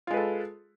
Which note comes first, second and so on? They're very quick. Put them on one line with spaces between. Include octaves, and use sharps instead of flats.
F4 G#3 B4 A4